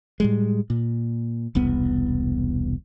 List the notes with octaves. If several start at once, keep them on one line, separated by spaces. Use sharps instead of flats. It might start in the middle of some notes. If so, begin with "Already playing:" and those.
A2 G3 G#3
A#2
E1 C2 B3